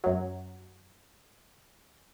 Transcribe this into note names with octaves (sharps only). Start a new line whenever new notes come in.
F#2 F#3